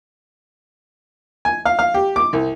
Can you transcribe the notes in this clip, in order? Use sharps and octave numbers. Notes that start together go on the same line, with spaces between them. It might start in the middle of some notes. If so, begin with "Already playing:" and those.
G#5
F5
F5
G4
D6
C2